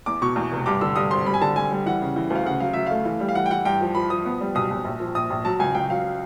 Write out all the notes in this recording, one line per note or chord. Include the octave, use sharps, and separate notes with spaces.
E2 D6
B2 C#6
E2
F1
G2 D6
D3 E6
G2 D#6
G#1 C6
G3 B5
G#5
D3 A5
G3 G#5
G3
E3 F#5
C#3
E3
D2
F5
C#3 F#5
F#3 F5
F#3 E5
A3 F5
E3
G3
F5
E3 F#5
G5
E3 F#5
G2 G5
F3
F3 B5
F3 D#6
B3
G3
B1 D#6
B1
A#1
F3
A#1 D#6
A#1
F#3 A5
C#2 G#5
C#2 G5
F#3 F5